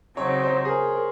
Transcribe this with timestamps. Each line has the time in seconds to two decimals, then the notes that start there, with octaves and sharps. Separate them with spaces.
0.16 C#3 F#3 C4 D#4 C#5
0.43 C5
0.65 G#4
0.69 A#4
0.96 A#4